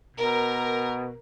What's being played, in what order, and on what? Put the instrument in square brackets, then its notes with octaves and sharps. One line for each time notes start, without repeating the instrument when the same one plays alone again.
[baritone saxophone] B2 [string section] A#4